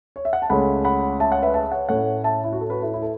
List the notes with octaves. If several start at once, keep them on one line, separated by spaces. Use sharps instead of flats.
C#5
E5
F#5
A5
C#2 C#3 A3 C#4 F#5 B5
F#5 B5
E5 A5
C#5 F#5
B4 E5
E5 A5
C#5 F#5
A2 A3 C#4 C#5 F#5
E5 A5
E4
F#4
A4
F#4 B4
E4 A4
E4
A4